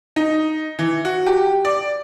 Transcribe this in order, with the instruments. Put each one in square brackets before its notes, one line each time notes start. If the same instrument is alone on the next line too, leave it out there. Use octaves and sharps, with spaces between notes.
[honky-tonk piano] D#4
E3
F#4
G4
D5